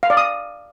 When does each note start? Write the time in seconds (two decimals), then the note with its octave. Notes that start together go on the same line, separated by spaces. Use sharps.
0.03 F5
0.10 D5
0.17 D#6